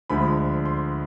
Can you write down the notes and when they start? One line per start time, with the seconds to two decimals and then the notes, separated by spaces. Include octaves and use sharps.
0.10 D2 D3 F3 G#3 B5
0.65 C6